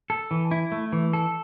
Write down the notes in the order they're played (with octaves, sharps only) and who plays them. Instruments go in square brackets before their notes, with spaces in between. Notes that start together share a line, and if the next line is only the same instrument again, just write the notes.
[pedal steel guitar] A4
E3
E4
A3
E3
A4